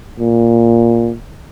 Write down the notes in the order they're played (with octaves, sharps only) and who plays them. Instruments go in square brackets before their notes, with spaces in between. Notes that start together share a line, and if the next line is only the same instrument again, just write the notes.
[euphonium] A#2